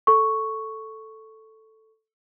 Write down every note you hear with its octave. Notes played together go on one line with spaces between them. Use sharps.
A4 C#6